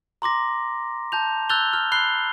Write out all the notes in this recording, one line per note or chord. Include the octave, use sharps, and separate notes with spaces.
A#5 C6 D6 A#6
A5 G6 F7
E6 F#6 G6 A6 F7 G7
F6
B5 F#6 C7 G7